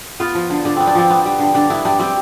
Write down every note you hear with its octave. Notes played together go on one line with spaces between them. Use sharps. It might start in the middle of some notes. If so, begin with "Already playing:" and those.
B3 F4
F3
D3
D3 D4
B3 C4
D4
F3 C4
B3
G3
D3
D3 D4
B3 E4
G3 D4
G3 C4